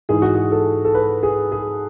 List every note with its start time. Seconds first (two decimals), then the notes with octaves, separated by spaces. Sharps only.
0.09 G#2 E3 G#4
0.22 F#4
0.35 G#4
0.52 A4
0.85 A4
0.95 B4
1.23 G#4
1.52 G#4